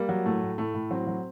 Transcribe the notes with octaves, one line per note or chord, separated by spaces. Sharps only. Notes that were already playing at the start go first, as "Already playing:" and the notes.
Already playing: G3 A#3
F#3
A2 A3
A2
A2 A3
A2
F#3 C4
F#3